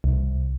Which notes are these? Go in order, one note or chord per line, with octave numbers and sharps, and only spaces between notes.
C2